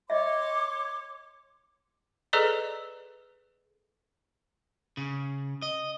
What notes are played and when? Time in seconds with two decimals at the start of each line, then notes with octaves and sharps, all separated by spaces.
0.10 C#5 D#5 E5 C6 D6
2.33 G#4 A4 B4 D5 D#5 A#5
4.97 C#3
5.62 D#5